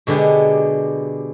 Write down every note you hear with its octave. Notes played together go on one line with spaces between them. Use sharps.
B2 D3 G#3 B3 G4